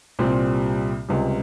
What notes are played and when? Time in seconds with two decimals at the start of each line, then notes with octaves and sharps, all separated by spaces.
0.19 C2 A#2 G3 C4
1.08 C#2 C3 G3